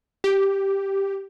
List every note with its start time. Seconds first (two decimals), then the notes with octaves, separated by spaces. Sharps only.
0.24 G4